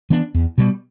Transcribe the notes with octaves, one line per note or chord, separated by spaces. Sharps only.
E3 B3 D4
E2
B2 G3 B3